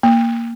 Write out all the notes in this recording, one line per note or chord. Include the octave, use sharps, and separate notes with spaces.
A#3